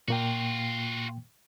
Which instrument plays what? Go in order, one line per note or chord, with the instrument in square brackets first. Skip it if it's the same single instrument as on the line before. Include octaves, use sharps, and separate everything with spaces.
[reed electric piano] A#2 A#3 G5 [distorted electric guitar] F4 F#4